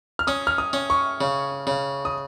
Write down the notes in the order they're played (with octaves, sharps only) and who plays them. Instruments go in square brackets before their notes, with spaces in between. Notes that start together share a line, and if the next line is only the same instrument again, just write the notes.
[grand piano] F6
[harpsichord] C#4 [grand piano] D#6
[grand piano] F6
D#6
[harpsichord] C#4
[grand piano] C#6
[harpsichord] C#3
C#3
[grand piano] D#6